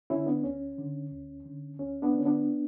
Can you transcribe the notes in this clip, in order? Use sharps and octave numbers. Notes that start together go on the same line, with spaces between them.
D3 C#4 E4
B3 D4
D2 C#4
D3
D2
D3
D2 C#4
B3 D4
D3 C#4
B3 D4